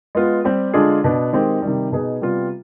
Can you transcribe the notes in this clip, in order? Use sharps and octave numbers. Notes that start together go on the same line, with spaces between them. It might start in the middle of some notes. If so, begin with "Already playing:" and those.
G#3 B3 F4
G3 C4 G4
D3 G#3 D4 F4 G#4
B2 B3 D4
D#3 G#3 C4 G4
C3 D#3 G3
B2 B3 D#4 G#4
C3 G3 B3 F4